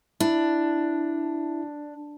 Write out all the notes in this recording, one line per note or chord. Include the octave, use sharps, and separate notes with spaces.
D4 E4